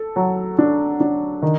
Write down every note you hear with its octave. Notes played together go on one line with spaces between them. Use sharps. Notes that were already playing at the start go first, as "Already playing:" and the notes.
Already playing: A4
F#3
D4
D4
D#3